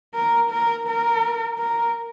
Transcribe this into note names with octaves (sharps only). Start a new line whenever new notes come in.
A#4
A#4
A#4
A#4